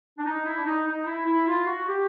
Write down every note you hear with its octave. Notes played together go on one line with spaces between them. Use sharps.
D4
D#4
E4
D4
D#4
D#4
E4
E4
F4
F#4
G4